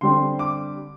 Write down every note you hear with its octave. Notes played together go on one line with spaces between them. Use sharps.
D3 G3 C4 C6
D6